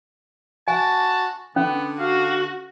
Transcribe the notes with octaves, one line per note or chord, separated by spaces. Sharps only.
F#4 G#5 A5
D3 B3 C#4
F#4 F5